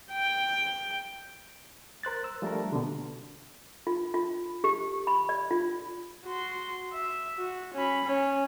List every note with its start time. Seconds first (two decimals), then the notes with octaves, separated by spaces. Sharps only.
0.13 G5
2.03 A#4 C5 F#6 A6
2.24 E6
2.42 F3 G3 A3 D4 A#4
2.72 B2 D3
3.87 F4
4.14 F4
4.64 G4
5.07 B5
5.29 D5
5.51 F4
6.25 F#4 C6
6.93 E5
7.38 F#4
7.74 C#4 B5
8.05 C#4